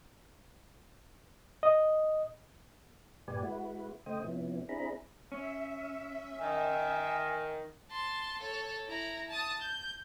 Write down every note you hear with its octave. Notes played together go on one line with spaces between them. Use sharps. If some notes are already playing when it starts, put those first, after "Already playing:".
D#5
G2 A#2 G4 B4 D5 G#5
G#3 E4 F#4 B4
C#3 A3 C5 D#5 G5 D#6
C3 F3 B3 C#4 E4
C4 D4 E4 G#4 A#5 B5
C#4 E5
D#3 G#5
A5 C6
A4 C#5
E4 A#5
A5 D#6
G6